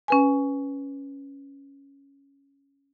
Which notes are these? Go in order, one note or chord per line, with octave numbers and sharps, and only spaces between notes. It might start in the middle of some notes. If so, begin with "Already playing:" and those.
C#4 B4 G#5